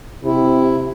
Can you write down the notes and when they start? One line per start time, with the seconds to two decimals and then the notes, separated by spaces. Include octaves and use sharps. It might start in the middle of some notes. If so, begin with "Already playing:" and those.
0.25 C3 E4